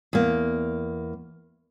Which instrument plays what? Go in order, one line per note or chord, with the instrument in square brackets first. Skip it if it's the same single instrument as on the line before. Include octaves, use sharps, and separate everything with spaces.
[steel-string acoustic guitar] E2 A#3